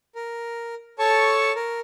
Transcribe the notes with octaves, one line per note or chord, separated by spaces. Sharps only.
A#4
A4 C#5 A5 C#6
A#4